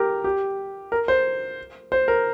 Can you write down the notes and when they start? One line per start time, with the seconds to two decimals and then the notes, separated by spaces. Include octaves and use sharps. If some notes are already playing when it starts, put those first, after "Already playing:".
Already playing: G4 A#4
0.24 G4
0.92 A#4
1.08 C5
1.92 C5
2.08 A#4